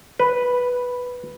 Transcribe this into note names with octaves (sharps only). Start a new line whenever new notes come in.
B4